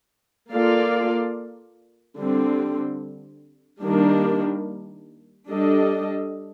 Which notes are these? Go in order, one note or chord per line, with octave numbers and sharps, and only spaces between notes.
A#3 F4 A4 D5 F5
D3 G3 C4
D#3 G3 A#3 D4
G3 D4 A4 D#5